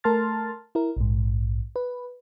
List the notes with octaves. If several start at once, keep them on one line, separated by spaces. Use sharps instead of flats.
A3 A#4 A5 C6 F6 A6
E4 A#4
A#1 G#2
B4